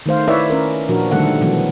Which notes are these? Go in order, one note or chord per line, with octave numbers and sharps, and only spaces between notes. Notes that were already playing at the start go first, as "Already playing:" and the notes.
D#3 A3 C5 F5
E4 B4 C#5 D5 E5
C#4 A#4
A#2 F3 D4 F#4 A#4
D3 D#3 G3 A3 A4 F#5
B2 E3 F#3 B3